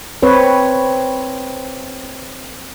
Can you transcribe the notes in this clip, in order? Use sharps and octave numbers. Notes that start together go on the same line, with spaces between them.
C4 B4 C#5